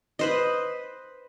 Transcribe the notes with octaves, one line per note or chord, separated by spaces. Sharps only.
B4 C5 D#5